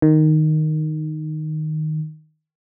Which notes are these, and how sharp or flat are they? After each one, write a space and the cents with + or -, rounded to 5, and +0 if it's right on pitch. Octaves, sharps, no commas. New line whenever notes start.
D#3 -5